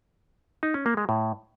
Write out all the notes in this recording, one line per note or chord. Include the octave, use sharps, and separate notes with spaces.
D#4
C#4
A#3
G#3
A2